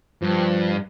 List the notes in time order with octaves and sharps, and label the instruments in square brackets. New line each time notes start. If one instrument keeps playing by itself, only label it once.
[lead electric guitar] G2 [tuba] F3